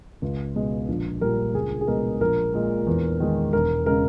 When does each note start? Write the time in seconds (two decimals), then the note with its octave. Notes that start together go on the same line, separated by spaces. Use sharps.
0.22 C#2
0.55 B2 G#3
0.89 A#1
1.21 A#2 G3 A#4
1.54 C#2 G#4
1.81 G#4
1.87 B2 G#3 A#4
2.21 A#1 A#4
2.54 A#2 G#3
2.87 E2
3.20 D#3 G#3
3.53 E1 A#4
3.86 C#3 G#3 A#4